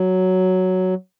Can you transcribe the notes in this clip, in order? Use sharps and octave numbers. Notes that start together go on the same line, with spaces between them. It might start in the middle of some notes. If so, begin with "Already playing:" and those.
Already playing: F#3